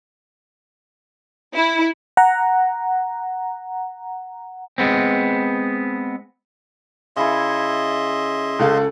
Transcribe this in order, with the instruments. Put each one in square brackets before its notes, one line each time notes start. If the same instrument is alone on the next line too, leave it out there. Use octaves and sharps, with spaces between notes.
[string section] E4
[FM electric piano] F#5 A#5
[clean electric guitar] G#3 B3 C4
[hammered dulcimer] C#3 E4 A4 [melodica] D#5 E5 C6
[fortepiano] C#2 C#3 F5 [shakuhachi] A4